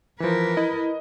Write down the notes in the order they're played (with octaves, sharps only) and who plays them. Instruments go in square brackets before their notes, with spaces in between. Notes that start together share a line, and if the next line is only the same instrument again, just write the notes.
[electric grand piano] E3 F3 [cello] A#4 B4
[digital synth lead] E4 [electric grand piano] D#5